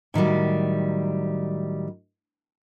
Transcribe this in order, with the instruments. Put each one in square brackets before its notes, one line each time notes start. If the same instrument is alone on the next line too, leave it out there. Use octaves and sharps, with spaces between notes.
[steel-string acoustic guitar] A2 D#3 F#3 G3